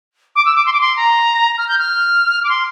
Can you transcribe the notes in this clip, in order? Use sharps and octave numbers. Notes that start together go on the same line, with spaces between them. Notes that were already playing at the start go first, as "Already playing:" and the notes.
D6
E6
D6
C6
D6
C6
A#5
F6
G6
F6
D6
C6